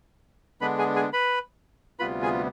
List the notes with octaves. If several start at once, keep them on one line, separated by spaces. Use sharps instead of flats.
D3 G#3 B3 D4 B4 B5
G#4 G#5
G#4 G#5
B4 B5
D2 C3 G3 B3 F4 B4 B5
G#4 G#5